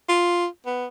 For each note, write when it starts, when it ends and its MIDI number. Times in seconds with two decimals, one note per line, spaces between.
0.09 0.47 65
0.66 0.86 59